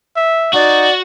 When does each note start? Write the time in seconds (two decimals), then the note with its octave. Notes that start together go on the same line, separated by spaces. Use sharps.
0.17 E5
0.54 D#4 F#4 D5